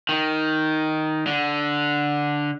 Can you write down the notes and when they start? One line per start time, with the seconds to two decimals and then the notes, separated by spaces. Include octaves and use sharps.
0.09 D#3
1.27 D3